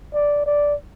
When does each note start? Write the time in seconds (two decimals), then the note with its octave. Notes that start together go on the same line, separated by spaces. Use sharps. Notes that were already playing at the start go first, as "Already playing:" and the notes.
0.14 D5
0.46 D5